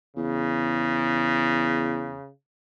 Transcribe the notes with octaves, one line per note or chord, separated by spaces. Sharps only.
E2 C#3